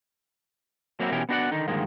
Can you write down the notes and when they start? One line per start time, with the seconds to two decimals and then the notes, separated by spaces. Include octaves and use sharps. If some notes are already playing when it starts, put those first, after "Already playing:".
1.00 F#3 A#3 C4 C#4 E4 F#4
1.11 B2 E3 C#4 D#4 G4 A#4
1.29 B3 D4 F#4 C5 D5 F#5
1.51 D3 D#3 D#4
1.68 G2 D3 D#3 F3 G#3 A#3